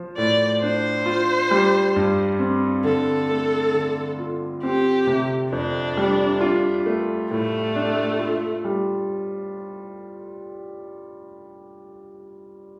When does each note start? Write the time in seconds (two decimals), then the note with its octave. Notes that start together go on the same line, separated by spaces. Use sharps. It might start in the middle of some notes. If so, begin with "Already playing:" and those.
Already playing: F3 F4
0.17 A2 D5
0.61 D4 C5
1.06 F4
1.51 G3
1.96 G2
2.40 C4
2.85 D3 A4
3.30 A3
3.74 D3
4.19 F4
4.63 C4 G4
5.07 C3
5.52 F2 D4
5.97 G3
6.41 F4
6.86 A3
7.31 A2 A3
7.75 D4
8.19 F4
8.65 G3